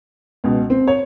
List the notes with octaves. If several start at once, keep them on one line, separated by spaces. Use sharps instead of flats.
C#2 B2
C4
C#5